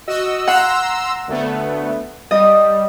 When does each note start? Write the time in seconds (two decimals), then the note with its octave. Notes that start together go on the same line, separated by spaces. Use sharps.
0.07 F#4 D#5 E6
0.47 F#5 A#5 C6 E6
1.28 D2 A3 B3
2.31 G3 D#5